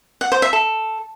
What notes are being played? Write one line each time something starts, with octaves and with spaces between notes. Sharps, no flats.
F#5
C5
E5
A4